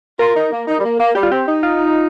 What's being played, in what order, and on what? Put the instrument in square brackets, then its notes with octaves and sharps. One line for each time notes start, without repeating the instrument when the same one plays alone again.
[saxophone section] F4 [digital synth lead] A#4
[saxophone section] D#4
A#3
D#4
G3
A#3
A#3
[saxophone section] G3 [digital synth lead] G4
[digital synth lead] F4
[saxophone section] C4 [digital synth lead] G4
[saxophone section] D#4
[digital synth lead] F4